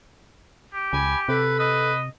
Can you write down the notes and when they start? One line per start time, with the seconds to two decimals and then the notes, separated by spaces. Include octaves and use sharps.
0.74 G4
0.93 C#2 G#5 B5
1.28 C3 A4 B4
1.60 B4 D#5